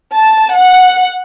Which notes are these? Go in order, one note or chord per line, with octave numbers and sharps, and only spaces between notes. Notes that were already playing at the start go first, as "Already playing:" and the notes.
A5
F#5